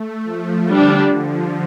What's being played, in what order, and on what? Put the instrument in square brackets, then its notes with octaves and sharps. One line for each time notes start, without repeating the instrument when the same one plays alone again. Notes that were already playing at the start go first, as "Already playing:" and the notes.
Already playing: [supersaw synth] A3
F3
[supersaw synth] D3 [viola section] G3 D4 G4
[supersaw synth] F3